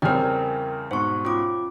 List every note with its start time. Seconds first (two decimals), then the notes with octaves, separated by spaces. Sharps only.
0.02 E2 C#3 G3 C4 A#4 G5 G#5 F6
0.91 G#2 B2 C5 C#6
1.25 C#4 F4 D6